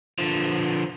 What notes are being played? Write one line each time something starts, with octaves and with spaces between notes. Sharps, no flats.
D3 F3